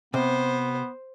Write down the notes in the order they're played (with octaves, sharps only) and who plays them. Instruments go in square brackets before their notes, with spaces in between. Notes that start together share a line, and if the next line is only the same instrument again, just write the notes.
[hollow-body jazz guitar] C3 [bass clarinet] B3 [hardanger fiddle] C5